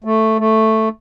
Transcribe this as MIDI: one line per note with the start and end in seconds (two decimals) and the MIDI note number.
0.04 0.38 57
0.39 0.89 57